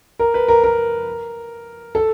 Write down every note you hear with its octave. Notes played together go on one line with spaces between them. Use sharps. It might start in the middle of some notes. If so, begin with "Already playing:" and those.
A#4
B4
A#4
A#4
A4